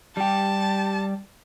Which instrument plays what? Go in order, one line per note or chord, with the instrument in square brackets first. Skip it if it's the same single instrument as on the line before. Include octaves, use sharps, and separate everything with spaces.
[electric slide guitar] G3 G4 [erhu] A5